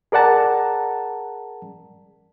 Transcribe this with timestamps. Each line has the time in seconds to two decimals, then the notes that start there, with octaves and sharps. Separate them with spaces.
0.12 G#4 A#4 D5 F#5 A5 A#5